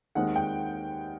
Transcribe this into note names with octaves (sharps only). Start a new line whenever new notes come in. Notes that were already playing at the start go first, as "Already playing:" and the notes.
D#2 D#3 G#3 C4 F#5
G5